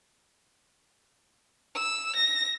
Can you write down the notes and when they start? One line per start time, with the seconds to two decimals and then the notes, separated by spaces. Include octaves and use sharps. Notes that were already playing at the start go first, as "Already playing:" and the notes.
1.75 E6
2.16 A#6